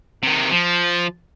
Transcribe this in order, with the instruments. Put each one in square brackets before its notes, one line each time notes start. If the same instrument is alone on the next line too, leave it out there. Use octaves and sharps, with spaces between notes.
[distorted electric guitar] C3 D#3
F3